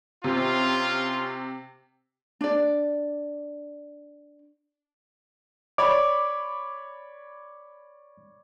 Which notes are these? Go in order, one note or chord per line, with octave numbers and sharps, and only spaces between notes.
C3 C#4 F4
D4 D5
C#5 D5 B5 D6